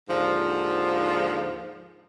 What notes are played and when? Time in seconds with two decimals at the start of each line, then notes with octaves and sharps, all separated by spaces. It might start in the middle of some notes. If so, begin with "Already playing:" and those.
0.08 D#2 G#2 D3 F3